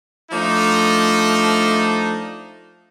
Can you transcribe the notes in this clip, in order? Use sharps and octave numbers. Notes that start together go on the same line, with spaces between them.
F3 A3 D4 D#4